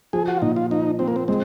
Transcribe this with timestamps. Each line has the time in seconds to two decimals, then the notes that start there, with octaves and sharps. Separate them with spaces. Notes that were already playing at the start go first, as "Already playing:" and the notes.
0.13 F3 G#4
0.28 F#4
0.37 F4
0.42 A#2 D#4
0.56 F4
0.71 F3 D#4
0.99 F3 C4
1.08 A#3
1.16 C4
1.28 G#3 C4